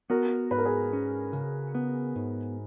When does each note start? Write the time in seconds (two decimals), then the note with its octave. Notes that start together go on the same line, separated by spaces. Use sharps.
0.10 B3 F#4 A#4
0.51 G#2 B4
0.58 A#4
0.65 G#4 B4
0.93 C#4
1.33 C#3
1.75 B3
2.16 G#2